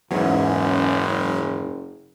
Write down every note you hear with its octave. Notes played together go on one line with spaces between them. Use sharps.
F#1 E2 G#2 F#3 C#4